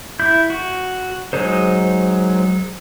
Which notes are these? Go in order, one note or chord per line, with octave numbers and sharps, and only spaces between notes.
E4 G6
F#4
F#3 G#3 D#4 C5